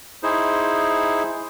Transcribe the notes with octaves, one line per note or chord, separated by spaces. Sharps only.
D#4 E4 G#4 C5